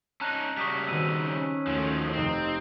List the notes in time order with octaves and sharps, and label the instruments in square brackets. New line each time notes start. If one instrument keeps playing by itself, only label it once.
[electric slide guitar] C#4 D#4 [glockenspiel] A5 A#5 F#6
[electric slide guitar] C#3 F#3 G3 [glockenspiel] C#6 D#6 B6
[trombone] B2 [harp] D#3 C4 [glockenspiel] E6 D#7
[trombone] C#4
[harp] D#2 A3 C#5 [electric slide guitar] F3 F#3
[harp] F1 G5 D#6 [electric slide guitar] C4 [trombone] D#4